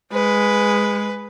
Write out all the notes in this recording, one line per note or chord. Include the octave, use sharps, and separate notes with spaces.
G#3 B4